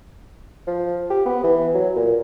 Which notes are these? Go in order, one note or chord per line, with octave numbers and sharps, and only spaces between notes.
F3
G4
B3
E3
F#3
A#2